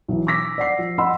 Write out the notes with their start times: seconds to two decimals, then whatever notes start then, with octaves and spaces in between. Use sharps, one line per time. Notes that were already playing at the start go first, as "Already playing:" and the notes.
0.08 B1 E3
0.27 D6 E6 A#6 B6
0.58 D5 F#5 C7
0.78 F3
0.98 D#5 F#5 B5 C6 E6